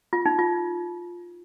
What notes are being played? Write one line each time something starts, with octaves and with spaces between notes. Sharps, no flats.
F4
D#4
F4